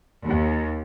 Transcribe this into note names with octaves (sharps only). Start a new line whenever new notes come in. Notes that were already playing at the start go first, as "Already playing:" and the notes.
D#2